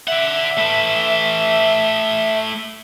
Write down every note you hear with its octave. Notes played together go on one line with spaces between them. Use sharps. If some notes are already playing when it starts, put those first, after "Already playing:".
D5 E5 F#5
A3 B4